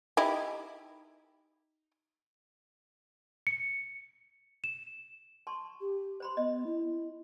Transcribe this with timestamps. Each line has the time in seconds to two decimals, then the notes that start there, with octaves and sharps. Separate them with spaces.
0.17 D#4 E4 G4
3.47 C#7
4.64 E7
5.47 A5 C6 C#6
5.81 G4
6.20 C5 B5 C6
6.37 B3 D#5
6.66 E4